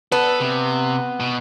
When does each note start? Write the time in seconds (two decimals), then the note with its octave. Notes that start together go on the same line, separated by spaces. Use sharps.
0.12 B3 A4
0.40 C3
1.20 B2